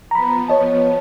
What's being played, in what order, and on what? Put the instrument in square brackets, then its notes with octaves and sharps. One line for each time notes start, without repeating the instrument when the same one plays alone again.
[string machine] F3 B3 [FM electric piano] A#5 B5
[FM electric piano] C#5 D#5 A5